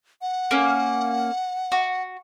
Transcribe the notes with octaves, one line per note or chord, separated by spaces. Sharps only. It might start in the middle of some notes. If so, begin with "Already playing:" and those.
F#5
A#3 C#4
F#4